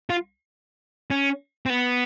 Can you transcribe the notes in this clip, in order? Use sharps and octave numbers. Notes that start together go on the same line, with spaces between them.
F4
C#4
C4
B3